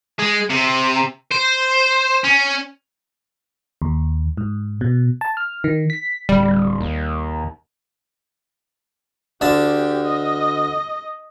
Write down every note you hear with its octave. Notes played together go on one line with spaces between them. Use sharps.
G#3
C3
C5
C#4
D#2
G#2
B2
A5
F6
D#3
B6
D1 G3
D#2
D2 D3 G4 A5
D#5